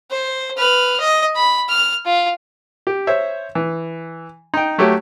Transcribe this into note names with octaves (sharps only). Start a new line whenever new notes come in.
C5
B4 F6
D#5
B5
F6
F4
G4
C5 C#5 E5
E3
D#4 G5
F#3 A3 F#4 G4 C#5